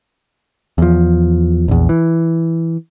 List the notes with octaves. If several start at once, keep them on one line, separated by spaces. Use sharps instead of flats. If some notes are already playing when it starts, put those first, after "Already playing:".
E2 F3
A#1 E2
E3